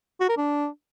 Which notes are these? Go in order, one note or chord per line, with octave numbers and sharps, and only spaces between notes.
F#4
A#4
D4